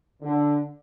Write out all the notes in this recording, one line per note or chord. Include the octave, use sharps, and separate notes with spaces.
D3